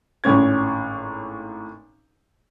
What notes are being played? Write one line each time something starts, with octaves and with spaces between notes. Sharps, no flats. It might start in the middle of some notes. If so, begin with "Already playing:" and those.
G#1 A2 C#4 G#6